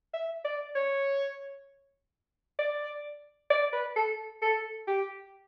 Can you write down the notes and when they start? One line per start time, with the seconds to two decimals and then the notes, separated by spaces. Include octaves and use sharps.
0.14 E5
0.44 D5
0.75 C#5
2.59 D5
3.50 D5
3.73 B4
3.96 A4
4.42 A4
4.88 G4